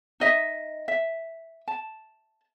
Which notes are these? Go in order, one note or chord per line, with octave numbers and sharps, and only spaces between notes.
D#4 D#5 E5
E5
A5